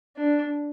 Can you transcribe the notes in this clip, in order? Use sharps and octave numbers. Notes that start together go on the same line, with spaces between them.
D4